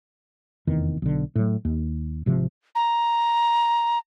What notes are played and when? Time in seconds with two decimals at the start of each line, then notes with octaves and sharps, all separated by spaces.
0.67 F1 E2 D#3
1.02 B1 D3
1.35 A2 F#3
1.65 D#2
2.26 G#1 C3 F3
2.75 A#5